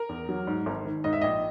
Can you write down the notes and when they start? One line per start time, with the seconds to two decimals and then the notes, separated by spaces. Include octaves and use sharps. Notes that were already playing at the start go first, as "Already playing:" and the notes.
Already playing: A#4
0.09 E2
0.29 F#3
0.47 G#2
0.66 G#1
0.85 D#3
1.04 G#2 D#5
1.13 E5
1.21 A#1 D#5